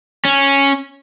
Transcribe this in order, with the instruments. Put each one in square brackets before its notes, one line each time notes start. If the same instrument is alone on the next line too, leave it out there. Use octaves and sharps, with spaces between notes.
[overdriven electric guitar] C#4